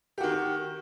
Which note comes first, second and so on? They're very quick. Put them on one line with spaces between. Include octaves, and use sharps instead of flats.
G4 F#4 D#3